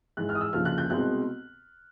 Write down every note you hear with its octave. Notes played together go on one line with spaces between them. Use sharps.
G#2 E3 G#3 F#6
F6
D#6
E6
D2 C#3 F3 A#3 F6
F#6
G6
C2 B2 G#3 C4 F#6